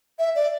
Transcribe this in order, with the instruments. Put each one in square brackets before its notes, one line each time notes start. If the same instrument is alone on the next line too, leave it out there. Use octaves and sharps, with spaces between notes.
[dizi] E5
D5